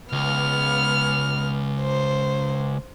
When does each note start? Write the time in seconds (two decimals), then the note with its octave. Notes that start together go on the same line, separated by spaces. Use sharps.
0.12 C#2 B3 F6
1.81 C5